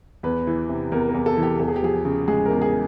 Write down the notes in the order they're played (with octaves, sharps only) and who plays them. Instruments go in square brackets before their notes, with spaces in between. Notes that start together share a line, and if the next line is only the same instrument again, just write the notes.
[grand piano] E2 B4
E3
C3
E2 A#4
A#4
E2
A4
E3
G4
E2 A4
G#4
G4
F3 G#4
C#3
G#3 G#4
A#4
E2
G#4